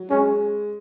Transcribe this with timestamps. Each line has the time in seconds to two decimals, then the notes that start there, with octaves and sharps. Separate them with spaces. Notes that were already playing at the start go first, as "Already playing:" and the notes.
Already playing: F#3
0.10 G#3 C#4